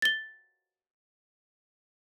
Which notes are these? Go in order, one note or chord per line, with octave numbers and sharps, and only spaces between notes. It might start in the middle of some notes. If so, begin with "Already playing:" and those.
A6 G7